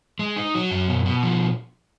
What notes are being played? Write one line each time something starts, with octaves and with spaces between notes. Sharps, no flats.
G#3
D#4
F#3
F#2
B2
B2
F3